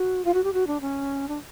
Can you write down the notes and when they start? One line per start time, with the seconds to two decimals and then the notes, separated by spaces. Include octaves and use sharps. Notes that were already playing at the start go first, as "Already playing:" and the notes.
Already playing: F#4
0.25 F4
0.34 F#4
0.44 G4
0.53 F#4
0.67 D4
0.81 C#4
1.28 D4